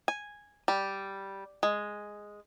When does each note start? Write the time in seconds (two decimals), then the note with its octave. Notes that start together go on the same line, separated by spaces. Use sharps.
0.08 G#5
0.68 G3
1.63 G#3